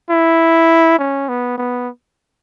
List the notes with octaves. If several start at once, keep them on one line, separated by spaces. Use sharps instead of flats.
E4
C#4
B3
B3